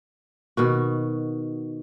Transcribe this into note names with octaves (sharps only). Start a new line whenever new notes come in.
B2 D#3 F#4